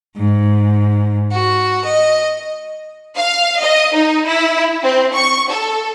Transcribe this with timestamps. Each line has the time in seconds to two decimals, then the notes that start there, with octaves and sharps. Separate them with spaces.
0.17 G#2
1.33 F#4
1.86 D#5
3.15 F5
3.60 D#5
3.93 D#4
4.25 E4
4.82 C4
5.13 C#6
5.49 A4